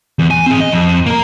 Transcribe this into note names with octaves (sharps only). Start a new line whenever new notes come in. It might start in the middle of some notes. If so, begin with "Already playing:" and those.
E2
G#5
C4 G#4
D#5
F2
A#3 A#4